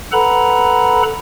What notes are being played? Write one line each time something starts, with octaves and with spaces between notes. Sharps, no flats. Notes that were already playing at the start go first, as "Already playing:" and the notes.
A4 B4 F#5 A#5 B5